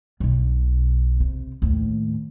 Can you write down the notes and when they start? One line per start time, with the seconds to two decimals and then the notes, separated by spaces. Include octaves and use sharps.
0.20 B1 B2
1.20 C3
1.62 D#2 A2